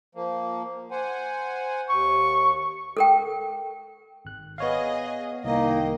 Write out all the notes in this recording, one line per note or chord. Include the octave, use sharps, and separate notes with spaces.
F3 A#3
C5 F#5 G#5
D#2 C#6
A4 A#4 G5
G#1 F#6
B3 G#4 C#5 D#5 F5
C2 D#3 A#3 D#5